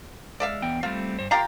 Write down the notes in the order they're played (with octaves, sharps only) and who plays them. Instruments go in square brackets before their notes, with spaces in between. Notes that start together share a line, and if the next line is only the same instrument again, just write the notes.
[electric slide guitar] G#3 [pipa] D5 E5 F5
[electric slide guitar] E2 B3 G5
[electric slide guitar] G3 A3 C4 [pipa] F4
[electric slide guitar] G2 C5
[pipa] F4 G4 A#5 [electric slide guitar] A#4 F5